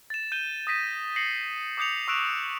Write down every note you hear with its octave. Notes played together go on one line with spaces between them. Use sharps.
A6 E7
G6 D#7 G7
D#6 A#6 B6 D#7
A#6 C7 C#7 F#7
D6 D#6 G6 C#7 F7
C#6 E6 F#6 D7 E7 F7